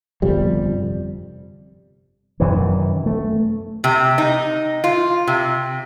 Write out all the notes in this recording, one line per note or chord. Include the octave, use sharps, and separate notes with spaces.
G1 F2 C3 G3
F#2 C3 D#3 E3
A3
C3
D#4
F4
C3